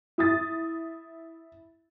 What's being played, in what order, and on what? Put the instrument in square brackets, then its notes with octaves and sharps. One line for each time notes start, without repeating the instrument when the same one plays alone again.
[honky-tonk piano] E4 D#6 A6